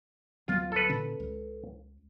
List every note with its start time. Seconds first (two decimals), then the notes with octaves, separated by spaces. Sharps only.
0.48 D2 F#3 B3 F4
0.72 A4 B4
0.89 A#2 D3 C#4
1.20 C#2